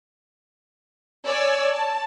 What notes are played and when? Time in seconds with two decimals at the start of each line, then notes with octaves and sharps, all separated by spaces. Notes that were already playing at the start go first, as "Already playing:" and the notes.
1.26 C#5 D5 G#5 E6
1.69 A5